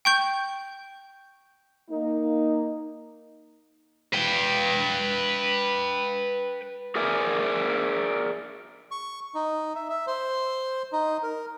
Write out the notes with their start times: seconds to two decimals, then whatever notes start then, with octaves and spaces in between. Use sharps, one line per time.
0.05 G5 C#6 G6
1.89 A#3 D#4
4.13 B4 G5
6.96 G#4 A#4 D5 E5 G#5
8.91 C#6
9.35 D#4
9.76 E5
9.90 E5
10.07 C5
10.93 D#4
11.23 A#4